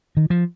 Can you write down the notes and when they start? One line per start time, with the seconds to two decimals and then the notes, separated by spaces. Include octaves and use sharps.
0.17 D#3
0.30 F3